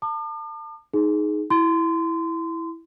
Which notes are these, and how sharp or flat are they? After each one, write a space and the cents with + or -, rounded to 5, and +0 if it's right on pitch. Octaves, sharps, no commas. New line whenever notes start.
A5 +30 D6 +45
D#4 +0 G#4 +15
E4 +0 C6 -25